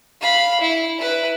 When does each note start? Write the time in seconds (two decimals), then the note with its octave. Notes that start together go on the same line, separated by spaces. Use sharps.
0.21 F5 B5
0.60 E4
0.99 E4 B4